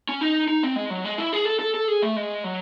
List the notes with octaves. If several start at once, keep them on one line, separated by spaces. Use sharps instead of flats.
C#4
D#4
D#4
C4
G#3
F#3
G#3
E4
G#4
A4
A4
A4
G#4
A3
G#3
F#3